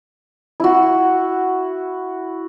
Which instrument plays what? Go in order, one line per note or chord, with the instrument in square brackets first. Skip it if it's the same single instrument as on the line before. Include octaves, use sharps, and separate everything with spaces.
[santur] E4 F#4